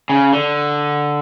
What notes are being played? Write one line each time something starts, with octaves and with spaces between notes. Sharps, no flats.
C#3
D3